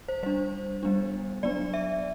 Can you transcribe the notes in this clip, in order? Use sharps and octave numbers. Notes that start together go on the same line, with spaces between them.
C5
G3 D4 C5
G3 B3 D4
F#3 B3 D4 D5
E5